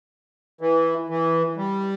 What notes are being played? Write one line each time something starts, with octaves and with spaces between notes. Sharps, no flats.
E3
E3
G3